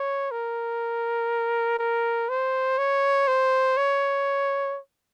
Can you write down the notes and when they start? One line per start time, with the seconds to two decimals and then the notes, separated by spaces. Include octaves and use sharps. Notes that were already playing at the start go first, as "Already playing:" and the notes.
Already playing: C#5
0.31 A#4
1.79 A#4
2.29 C5
2.78 C#5
3.28 C5
3.77 C#5